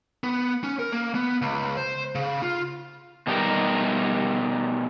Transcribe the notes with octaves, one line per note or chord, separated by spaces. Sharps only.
B3
C#4
A#4
A#3
B3
C#2
C5
C#3
F4
B2 G3 D#4 G4 A#4